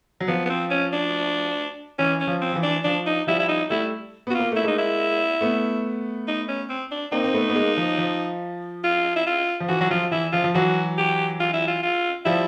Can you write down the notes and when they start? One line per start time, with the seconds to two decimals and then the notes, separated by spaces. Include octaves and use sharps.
0.20 F#3
0.28 F3 B3
0.46 B3
0.50 C4
0.70 C#4
0.93 D4
1.99 E3 C#4
2.20 C#4
2.27 F3
2.41 C4
2.52 F3
2.56 E3
2.63 D4
2.84 F3 D4
3.06 D#4
3.27 F3 G3 E4
3.39 E4
3.48 D#4
3.70 G3 A3 E4
4.27 B3 F#4
4.34 A#3 F4
4.52 A3 E4
4.63 G#3 A#3 D#4
4.78 E4
5.41 A3 B3
6.28 D#4
6.48 C#4
6.69 C4
6.91 D4
7.12 A#3 C4 D#4
7.24 C4
7.34 A3 B3
7.49 B3
7.55 G#3 A#3
7.77 F3
7.98 F3
8.84 F4
9.16 E4
9.26 F4
9.60 F3
9.68 E3 F#4
9.81 F#3 F#4
9.90 F3 F4
10.11 E3 E4
10.33 F3 F4
10.44 F3
10.55 E3 F#3 F#4
10.98 G4
11.40 F4
11.53 E4
11.68 F4
11.83 F4
12.25 F3 G3 E4